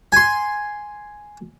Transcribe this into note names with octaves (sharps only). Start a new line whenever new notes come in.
G#5 C6